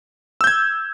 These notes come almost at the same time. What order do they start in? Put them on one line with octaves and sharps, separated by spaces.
E6 G6 G#6